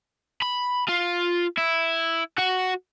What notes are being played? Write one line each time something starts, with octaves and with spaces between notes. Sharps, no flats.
B5
F4
E4
F#4 F#5